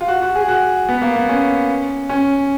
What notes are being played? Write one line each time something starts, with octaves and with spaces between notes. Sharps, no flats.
F4
F#4
F#4
G#4
F#4
B3
A#3
B3
C#4
C#4